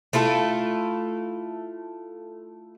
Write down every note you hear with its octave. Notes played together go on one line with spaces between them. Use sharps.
A3 E4 F4 A4